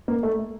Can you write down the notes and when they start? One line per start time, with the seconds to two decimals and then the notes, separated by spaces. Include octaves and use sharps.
0.08 A#3
0.23 A3